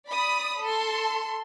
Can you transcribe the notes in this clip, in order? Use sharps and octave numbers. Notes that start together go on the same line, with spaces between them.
D5 B5 D#6
A4 C6